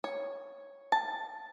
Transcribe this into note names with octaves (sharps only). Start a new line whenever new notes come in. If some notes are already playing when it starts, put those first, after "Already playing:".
C#5
A5